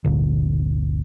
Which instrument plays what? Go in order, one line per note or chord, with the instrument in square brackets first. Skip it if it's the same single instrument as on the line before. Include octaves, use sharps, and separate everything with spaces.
[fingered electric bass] G1 D2 A#2 D3